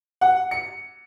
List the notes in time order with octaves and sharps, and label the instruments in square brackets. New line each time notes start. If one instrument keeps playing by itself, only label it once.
[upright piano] F#5
C#7